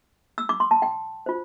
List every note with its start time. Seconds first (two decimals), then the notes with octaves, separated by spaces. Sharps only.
0.38 E6
0.49 D6
0.60 C6
0.71 A5
0.82 G5
1.26 F4 C5